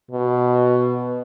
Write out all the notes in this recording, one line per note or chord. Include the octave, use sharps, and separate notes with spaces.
B2